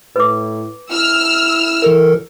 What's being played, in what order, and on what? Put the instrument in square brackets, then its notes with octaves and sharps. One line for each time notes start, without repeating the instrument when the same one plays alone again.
[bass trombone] A2 [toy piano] B4 D6
[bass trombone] E4 [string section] E6 F6
[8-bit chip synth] E3 A4 A#4